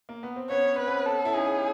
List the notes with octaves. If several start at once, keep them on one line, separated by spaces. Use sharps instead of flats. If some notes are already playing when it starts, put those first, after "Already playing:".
A#3
B3
C4
B3 C#4 C#5
C#4
C4 B4
B3 C#4
A4
E4
C#4 D#4 G#4